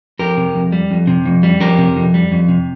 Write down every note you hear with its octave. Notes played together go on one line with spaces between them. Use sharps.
F2 G4 A#4
C3
F2
G3
F2
C3
F2
G3
F2 G4 A#4
C3
F2
G3
F2
C3